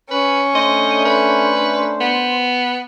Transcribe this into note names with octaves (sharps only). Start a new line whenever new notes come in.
C#4 B4
A3 D4 C5 D#5
B4
B3